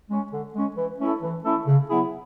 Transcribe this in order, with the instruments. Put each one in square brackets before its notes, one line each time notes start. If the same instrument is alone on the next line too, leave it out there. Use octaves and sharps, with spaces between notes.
[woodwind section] G#3 C#4
D3
G#3 C#4
E3
A3 C#4 E4 A4
E3
A3 C#4 E4 A4
C#3
F#3 B3 E4 G#4